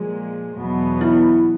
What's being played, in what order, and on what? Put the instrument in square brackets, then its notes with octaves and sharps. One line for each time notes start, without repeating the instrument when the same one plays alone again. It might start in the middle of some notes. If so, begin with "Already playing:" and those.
Already playing: [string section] A#2 F3 G#3
E2 B2 F#3 B3
[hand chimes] E4